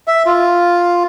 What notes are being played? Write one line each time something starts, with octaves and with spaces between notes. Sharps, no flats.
E5
F4